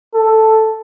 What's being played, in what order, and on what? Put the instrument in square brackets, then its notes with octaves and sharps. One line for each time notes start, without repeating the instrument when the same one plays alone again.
[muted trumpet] A4